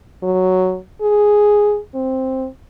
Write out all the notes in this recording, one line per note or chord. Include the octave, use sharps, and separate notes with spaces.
F#3
G#4
C4